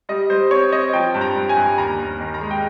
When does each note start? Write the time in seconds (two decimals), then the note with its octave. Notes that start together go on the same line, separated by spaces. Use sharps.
0.09 G3 D#5
0.30 G3 C5
0.51 C4 C#5
0.72 C4 D#5
0.93 F3 G5
1.14 G2
1.21 A#5
1.35 G2
1.49 G#5
1.57 G2
1.78 D#2 A#5
1.99 D#2
2.20 D#3
2.34 A#5
2.41 G#3
2.51 G5